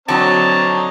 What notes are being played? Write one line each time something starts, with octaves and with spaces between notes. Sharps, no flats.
D3 F#3 C4 D4 C#5 D#5 A5 A#5